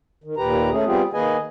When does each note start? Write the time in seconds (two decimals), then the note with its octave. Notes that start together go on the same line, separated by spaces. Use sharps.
0.24 D#3
0.37 D#2 A#2 G4 B4 A#5
0.71 A3 C#4 G#4
0.86 G3 B3 C4 F4 G4 G#4
1.13 D#3 A#3 G#4 B4 D#5 G#5